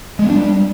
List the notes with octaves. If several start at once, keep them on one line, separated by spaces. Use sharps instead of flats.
G#3
B3
D4
G3